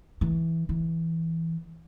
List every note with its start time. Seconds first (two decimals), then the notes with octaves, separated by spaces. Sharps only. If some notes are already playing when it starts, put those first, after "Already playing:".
0.21 E3
0.69 E3